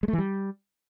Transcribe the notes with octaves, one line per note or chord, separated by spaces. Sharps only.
G#3
A3
E3
G3